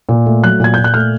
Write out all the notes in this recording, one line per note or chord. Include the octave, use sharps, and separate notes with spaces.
A#2
A3
F#3 F#6
A#2 G#6
A#2 G6
F#6
A3 F6